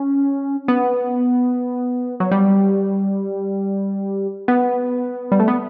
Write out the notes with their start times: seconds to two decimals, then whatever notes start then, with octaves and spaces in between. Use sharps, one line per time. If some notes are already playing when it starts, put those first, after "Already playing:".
Already playing: C#4
0.68 B3
2.20 F#3
2.31 G3
4.48 B3
5.32 G3
5.40 A3
5.48 B3